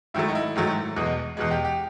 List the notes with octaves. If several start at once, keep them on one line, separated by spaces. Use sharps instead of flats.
G#2 D#3 F#3 A3 E4
D#4
E4
G#2 D#3 F#3 A3
E2 B2 G#3
E2 B2 G#3
G4
G4